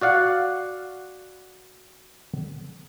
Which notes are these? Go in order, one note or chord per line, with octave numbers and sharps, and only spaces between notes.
F#4 D5 F5 F#5